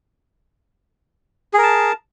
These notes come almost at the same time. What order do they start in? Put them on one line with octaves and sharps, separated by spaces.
G#4 A#4 A5